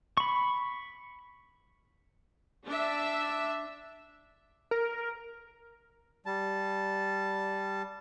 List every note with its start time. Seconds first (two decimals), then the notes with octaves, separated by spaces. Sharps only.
0.17 B5 C#6
2.65 D4 E5
4.71 A#4
6.26 G3 A5